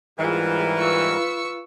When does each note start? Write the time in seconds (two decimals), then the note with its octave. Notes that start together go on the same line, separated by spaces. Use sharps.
0.19 G#2 E3 G3 F4 G#4 A#4
0.78 F4 B4 C#6 E6